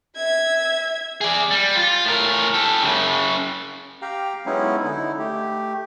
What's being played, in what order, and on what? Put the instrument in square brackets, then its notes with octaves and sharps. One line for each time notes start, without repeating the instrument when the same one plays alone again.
[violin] E5 G#6
[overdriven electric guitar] G#4 D5
G3
F4
A2 A#4
G4 A4
F#2 C#3
[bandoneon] G4 F5 G5 A#5
F#3 G#3 B3 C#4 D#4 E4
D3 D#4 E4
A3 G4